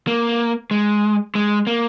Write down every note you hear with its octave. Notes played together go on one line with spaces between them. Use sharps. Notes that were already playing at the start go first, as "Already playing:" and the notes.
A#3
G#3
G#3
A#3